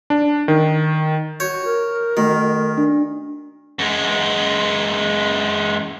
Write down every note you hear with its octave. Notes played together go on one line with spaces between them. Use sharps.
D4
D#3
F#4 C#5 G6
A#4
D#3 A3 F#4
D4
F#2 G#3